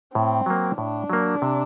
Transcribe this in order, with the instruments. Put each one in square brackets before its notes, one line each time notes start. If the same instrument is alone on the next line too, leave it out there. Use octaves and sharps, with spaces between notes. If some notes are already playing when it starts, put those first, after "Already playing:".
[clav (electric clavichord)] A2 [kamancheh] C4
[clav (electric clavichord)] F#3 A#3
[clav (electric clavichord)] A2 [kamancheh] D4
[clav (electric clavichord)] F#3 A#3
C3